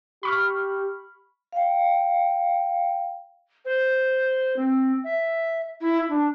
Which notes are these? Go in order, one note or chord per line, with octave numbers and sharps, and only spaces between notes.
G4 B5 C#6 F6
F5 G5
C5
C4
E5
E4
D4